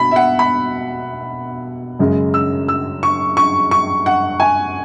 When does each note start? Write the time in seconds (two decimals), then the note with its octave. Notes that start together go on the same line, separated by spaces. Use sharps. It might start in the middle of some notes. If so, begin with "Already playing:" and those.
Already playing: B2 B5
0.11 E5
0.16 F#5
0.39 B5
1.99 F#2 C#3 G#3
2.34 E6
2.68 E6
3.03 C#6
3.37 C#6
3.71 C#6
4.06 F#5
4.40 G#5